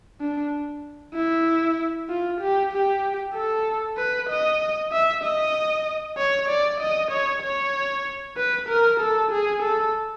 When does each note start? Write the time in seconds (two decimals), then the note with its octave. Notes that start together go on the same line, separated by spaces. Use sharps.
0.20 D4
1.14 E4
2.09 F4
2.41 G4
2.72 G4
3.34 A4
3.98 B4
4.29 D#5
4.92 E5
5.24 D#5
6.18 C#5
6.49 D5
6.81 D#5
7.11 C#5
7.43 C#5
8.37 B4
8.69 A#4
9.00 A4
9.31 G#4
9.63 A4